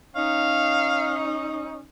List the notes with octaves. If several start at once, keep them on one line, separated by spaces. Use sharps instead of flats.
C#4 D#4 F5